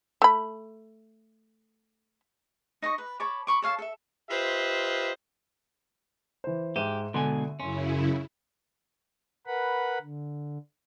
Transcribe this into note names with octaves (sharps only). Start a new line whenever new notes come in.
A3 B5
D#4 D#5 G#5 C#6
B4
C#5 A5 B5 D6
B5 C#6 D6
A4 C#5 F5 A5
A4 E5
F4 G4 B4 C5 D#5 E5
E3 C5
G#2 G4 E5 D#7 E7
B2 D3 G#3 G#5
F#2 C#3 C#4 E4 C6
A#4 B4 F#5 B5
D3